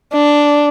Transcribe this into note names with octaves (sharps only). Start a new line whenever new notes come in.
D4